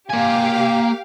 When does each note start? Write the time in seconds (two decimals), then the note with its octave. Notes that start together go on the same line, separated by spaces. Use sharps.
0.10 A#3 G4 F5 G#5